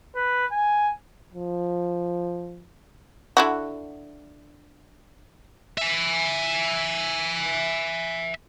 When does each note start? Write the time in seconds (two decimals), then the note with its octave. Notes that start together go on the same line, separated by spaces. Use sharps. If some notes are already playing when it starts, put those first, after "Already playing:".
0.16 B4
0.52 G#5
1.34 F3
3.37 D3 E4 F#4
5.78 E5 G#5